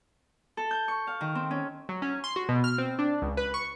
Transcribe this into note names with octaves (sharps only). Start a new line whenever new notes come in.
A4
G6
C#6
F5
D#3
C4
C#4
F#3
C#4
C6
F#4
B2
F6
C4
D4
C#2
B4
C#6